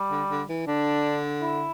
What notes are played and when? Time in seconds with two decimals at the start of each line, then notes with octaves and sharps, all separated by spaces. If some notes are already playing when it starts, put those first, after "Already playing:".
Already playing: G3
0.10 D3
0.30 D3
0.49 E3
0.67 D3 D4
1.42 E4